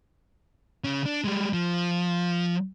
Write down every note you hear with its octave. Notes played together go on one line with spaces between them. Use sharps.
C#3 C#4
D4
G3 G#3
F3